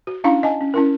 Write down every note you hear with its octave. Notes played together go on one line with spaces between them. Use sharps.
F#4
C#4 D4 E4 F5 A#5 C#6
D#5 G#5 A5
C#4
C#4 E4 A#4